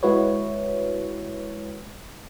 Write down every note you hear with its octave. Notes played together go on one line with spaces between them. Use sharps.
G#3 E4 F#4 B4 C#5